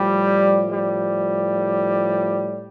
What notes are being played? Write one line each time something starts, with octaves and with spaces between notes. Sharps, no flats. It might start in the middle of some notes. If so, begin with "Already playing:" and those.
Already playing: A2 F3 G3
G3